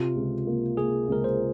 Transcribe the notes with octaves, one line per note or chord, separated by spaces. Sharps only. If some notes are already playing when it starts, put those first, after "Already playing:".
Already playing: C3 F4
C#2
A#3
A#3 G#4
C#2 A#4
C5